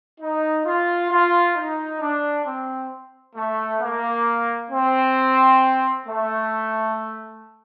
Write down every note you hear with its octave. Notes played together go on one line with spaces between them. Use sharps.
D#4
F4
F4
D#4
D4
C4
A3
A#3
C4
A3